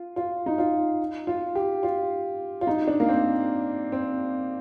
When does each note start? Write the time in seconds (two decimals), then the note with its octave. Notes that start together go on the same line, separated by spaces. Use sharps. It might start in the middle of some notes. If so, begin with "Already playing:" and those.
Already playing: F4
0.16 F4
0.46 D#4
0.58 F4
1.27 F4
1.55 G4
1.83 F4
2.61 F4
2.67 D#4
2.87 D4
3.00 A#3
3.08 C4
3.92 C4